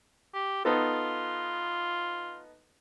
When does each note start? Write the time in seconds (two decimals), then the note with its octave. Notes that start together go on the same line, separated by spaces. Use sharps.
0.34 G4
0.65 B3 D#4 F4 A4